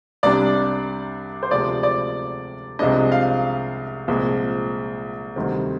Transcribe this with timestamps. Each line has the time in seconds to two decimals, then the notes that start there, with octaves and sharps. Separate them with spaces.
0.23 C2 C3 G3 D4 D5
1.43 C5
1.51 D2 C3 F3 G#3 C4 D5
1.83 D5
2.79 C2 C3 F3 G#3 D4 D#5
3.12 F5
4.08 C2 A#2 F3 G#3
5.36 D2 C3 D#3 G3 C4